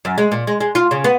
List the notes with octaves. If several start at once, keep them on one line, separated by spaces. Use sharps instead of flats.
F#2
G#3
A#2
G#3
G#3
F4
C#3
B3